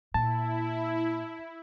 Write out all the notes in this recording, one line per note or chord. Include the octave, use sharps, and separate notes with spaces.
A#2 E4 A5